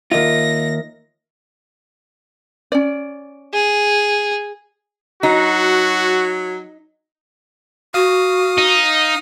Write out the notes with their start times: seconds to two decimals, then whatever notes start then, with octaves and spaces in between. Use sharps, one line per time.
0.11 D#2 F4 A#4 D#5 E5 A#6
2.72 C#4 D5
3.54 G#4
5.23 F#3 D#4 F#4
7.94 F#4 F5 D#6
8.58 D#4